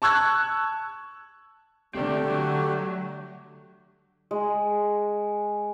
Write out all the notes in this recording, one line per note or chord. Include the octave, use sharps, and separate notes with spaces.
A5 C#6 E6 F#6 G#6
D3 A3 C4 G4 D5
F#3
G#3